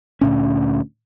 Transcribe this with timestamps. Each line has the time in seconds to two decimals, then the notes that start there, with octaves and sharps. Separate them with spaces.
0.21 D2 A#2 C#4